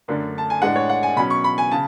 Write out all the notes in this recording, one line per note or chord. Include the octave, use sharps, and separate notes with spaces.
F#2 D3 A3 D4
A5
G#5
A2 G#3 D4 F#5
C#5
F#5
G#5
B2 F#3 C#4 B5
C#6
B5
G#5
C#3 A5